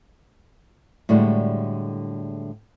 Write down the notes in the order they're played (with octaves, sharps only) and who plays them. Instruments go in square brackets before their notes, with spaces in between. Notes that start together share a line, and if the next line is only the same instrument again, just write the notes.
[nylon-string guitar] A2 D3 G3 G#3 F#4